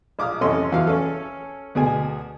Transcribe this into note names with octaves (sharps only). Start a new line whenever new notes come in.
A#1 D6 D#6 F6
A1 F2 C#4 A4 D#5 C6
E2 F#3 F5
C#4 A4 F6
D2 B2 G#4 G#5